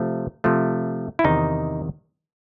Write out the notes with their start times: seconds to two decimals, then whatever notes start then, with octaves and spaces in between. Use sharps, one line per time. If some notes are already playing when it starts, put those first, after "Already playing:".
Already playing: C3 F3 A3
0.44 C3 F3 A3
1.19 E4
1.24 E2 C3 D#3 D#4